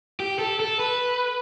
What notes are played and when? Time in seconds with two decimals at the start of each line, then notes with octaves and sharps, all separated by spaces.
0.20 G4
0.39 A4
0.60 A4
0.79 B4